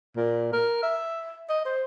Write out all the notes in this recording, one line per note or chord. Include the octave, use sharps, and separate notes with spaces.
A#2
A#4
E5
D#5
C5